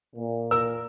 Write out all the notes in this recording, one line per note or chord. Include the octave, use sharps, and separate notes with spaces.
A#2
A#4 E6